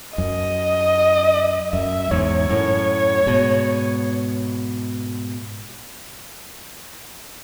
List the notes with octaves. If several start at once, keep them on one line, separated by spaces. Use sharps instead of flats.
F#2 D#5
F#2 E5
E2 G#2 C#5
F#2 A2
G#2 B2